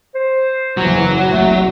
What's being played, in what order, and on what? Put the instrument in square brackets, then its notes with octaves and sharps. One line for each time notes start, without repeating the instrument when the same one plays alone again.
[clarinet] C5
[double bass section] F#1 E2 E3 [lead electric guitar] F#3
[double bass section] F#1 C2 [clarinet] A3